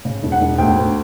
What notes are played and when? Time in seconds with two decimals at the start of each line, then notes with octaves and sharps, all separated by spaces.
0.05 C#3
0.23 E1
0.32 F#5
0.41 E1
0.58 D2 G5
0.76 D2